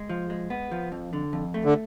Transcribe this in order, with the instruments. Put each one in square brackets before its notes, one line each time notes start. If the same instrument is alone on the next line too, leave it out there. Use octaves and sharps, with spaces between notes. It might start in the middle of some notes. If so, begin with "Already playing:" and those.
Already playing: [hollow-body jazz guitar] G#3
F3
G#3
B3
F3
F2
D3
F2
A3
[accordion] D3